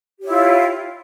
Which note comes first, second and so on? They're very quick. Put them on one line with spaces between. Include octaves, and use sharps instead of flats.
G4 C#5 E4 F4